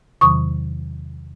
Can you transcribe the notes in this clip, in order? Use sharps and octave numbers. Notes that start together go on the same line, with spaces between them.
E2 C3 D#3 F#3 C#6 D#6